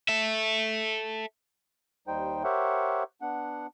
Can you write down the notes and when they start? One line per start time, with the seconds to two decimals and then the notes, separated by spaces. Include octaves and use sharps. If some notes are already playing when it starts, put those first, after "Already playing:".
0.09 A4 E5
2.08 D#2 G3 D#4 C5 G5
2.44 G4 A#4 C5 C#5 E5 F#5
3.22 B3 D4 F#5